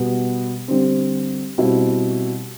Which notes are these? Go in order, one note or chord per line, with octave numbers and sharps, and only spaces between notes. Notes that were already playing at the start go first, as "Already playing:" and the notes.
Already playing: B2 G3 B3
D3 G3 C4
B2 G3 C4 E4